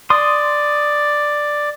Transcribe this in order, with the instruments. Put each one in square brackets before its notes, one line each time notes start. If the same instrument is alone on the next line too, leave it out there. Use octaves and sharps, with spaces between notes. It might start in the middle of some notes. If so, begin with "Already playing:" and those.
[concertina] D5 [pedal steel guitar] C6 D#6